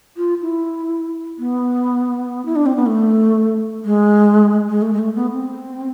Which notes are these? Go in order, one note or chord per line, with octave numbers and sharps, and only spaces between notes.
F4
E4
B3
E4
D4
C4
B3
A3
G#3
G#3
A3
G#3
A3
B3
C4